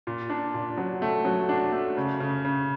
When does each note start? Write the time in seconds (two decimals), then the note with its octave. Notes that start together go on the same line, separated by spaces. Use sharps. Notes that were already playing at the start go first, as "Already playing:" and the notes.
0.07 A#2
0.30 D4
0.54 A#2
0.77 F#3
1.02 A3
1.25 F#3
1.49 D4
1.72 A3
1.97 C#3
2.20 C#3
2.45 C#3